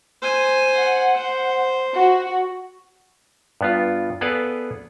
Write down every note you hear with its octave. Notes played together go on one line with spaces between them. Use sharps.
C5 G#5
F#5
C5
F#4
G2 B3 F4
B3 G#4 A4 B4 D5 F5